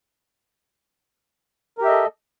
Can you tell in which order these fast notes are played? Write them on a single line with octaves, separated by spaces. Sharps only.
A#4 G4 E5 D#5 A4